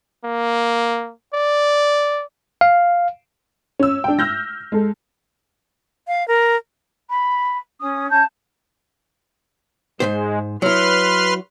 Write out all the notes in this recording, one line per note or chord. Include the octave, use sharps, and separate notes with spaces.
A#3
D5
F5
C#4 E6
D4 G5
E6 F6 G6 A#6
G#3 A4
F5
A#4
B5
C#4 D#6
C#4 A5 G6
G#2 C3 G#3 C5
F#3 E4 B4 C6 F6